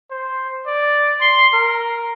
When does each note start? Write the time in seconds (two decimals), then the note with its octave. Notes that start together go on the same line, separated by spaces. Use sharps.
0.11 C5
0.67 D5
1.21 C6
1.54 A#4